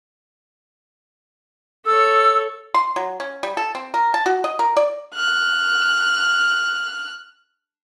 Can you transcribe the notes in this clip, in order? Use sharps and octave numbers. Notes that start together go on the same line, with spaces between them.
A4 C#5 E6
C6
F#3
C#4
G3
A4
C4
A#4
A5
F#4
D#5
A#4
D5
F6 F#6